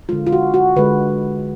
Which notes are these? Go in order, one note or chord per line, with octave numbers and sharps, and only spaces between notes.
D3 G#3 F4
F4
F#4
F#4
D3 G#3 B4